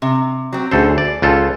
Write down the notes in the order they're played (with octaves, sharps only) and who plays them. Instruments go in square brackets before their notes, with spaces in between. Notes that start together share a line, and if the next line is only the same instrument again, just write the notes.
[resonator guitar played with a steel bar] C3
F#3 C4
[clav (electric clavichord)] D2 A4 C5 [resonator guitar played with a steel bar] C#4 G#4
[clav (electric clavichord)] D5
C#2 F4 A4